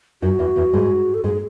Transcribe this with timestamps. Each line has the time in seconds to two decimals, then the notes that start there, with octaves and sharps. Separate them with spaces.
0.22 F#2 F#3 F#4
0.39 E2 E3
0.56 E2 E3
0.73 G#2 G#3
1.14 A4
1.24 G#2 G#3 G#4